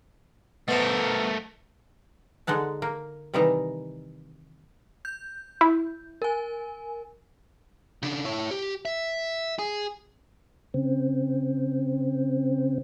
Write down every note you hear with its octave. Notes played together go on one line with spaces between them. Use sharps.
B2 A3 A#4 C5
D3 G#3 D#4 F#5 A5
A#3
C3 D#3 E3 G3 D#4 A#5
G6
E4
A#4 G#5
C#3 D4
E4 C#5
G4
E5
G#4
C#3 C4